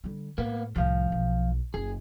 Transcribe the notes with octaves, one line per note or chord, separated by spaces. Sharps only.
D3 G3
A2 A#3 B3
C2 A2 F3 F5
B1
F#1 G#4